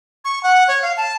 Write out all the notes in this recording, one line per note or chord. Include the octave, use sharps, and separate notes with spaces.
C#6
F#5
C#5
F5
A5